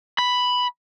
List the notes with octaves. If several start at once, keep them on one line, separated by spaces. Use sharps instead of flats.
B5